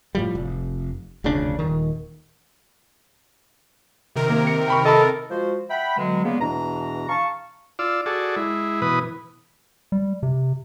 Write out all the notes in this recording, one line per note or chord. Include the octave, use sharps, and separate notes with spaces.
A2 F3 G3
F1
F1 D2 C#3 D4
D#1 D#3
C3 D#3 A#4
A#3
C#7
G5 B5 C#6
A4 D#5 A5 B5
F3 G#3 F#4 C5
E5 F#5 G5 B5
B2 D3 F#3 G#3
C#3 G3 G#3 A#3 B3
E2 B2 E3 D4 A#5
F5 A5 C#6
F4 D5 E6
F#4 G#4 A4 D5
G#3 E4
B2 E3 B4 D#6
G3
C3